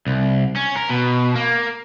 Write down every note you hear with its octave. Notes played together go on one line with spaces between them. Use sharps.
C2
C#4
A#4
B2
A#3